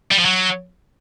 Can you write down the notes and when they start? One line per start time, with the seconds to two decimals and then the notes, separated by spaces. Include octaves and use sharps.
0.11 G3
0.18 F3
0.25 F#3